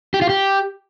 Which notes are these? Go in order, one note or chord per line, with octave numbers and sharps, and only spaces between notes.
G4
F4
G4